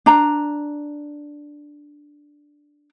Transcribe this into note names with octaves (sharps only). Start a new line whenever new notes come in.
D4 A#5